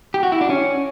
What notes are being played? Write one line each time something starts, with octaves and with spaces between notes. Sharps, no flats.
G4
F#4
E4
D4
C#4